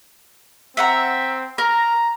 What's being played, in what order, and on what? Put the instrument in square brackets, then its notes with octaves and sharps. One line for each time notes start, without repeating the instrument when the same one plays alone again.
[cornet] C4 [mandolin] E5 F#5 A#5
[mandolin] A#4 [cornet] A#5